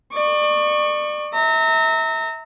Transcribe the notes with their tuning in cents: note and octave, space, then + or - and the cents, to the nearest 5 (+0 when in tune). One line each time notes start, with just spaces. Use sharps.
D5 +35 C#6 +0
E5 -30 A#5 -30